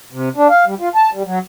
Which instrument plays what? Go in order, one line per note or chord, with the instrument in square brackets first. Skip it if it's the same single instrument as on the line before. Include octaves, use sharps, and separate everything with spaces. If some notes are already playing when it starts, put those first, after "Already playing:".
[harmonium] C3
D4
F5
G3
F4
A5
G3
F#3